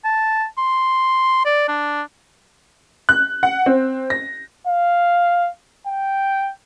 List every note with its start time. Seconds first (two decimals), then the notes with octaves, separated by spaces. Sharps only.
0.05 A5
0.58 C6
1.46 D5
1.68 D4
3.09 F#6
3.43 F#5
3.66 C4
4.10 A#6
4.67 F5
5.87 G5